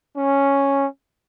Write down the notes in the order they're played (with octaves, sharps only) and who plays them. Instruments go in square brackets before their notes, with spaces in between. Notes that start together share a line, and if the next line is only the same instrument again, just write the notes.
[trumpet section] C#4